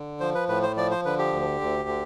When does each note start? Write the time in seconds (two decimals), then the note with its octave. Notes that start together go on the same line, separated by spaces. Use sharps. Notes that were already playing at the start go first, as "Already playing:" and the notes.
Already playing: D3
0.20 F3 C5
0.35 B4
0.49 A2 B4
0.62 C5
0.76 F3 D5
0.91 C5
1.05 D3 B4
1.19 G4
1.33 D2
1.61 D2
1.88 D3